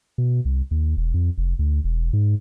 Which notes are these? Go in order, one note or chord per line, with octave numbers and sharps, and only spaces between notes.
B2
C2
D#2
E1
F2
F1
D2
E1
G#2